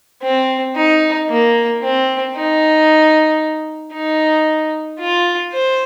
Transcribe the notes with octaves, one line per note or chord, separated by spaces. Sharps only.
C4
D#4
A#3
C4
D#4
D#4
F4
C5